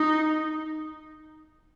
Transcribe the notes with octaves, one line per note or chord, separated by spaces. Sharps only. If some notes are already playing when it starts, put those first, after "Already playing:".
Already playing: D#4